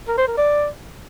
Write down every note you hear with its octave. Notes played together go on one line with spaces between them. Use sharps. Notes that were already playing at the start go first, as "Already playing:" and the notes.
A#4
C5
A#4
D5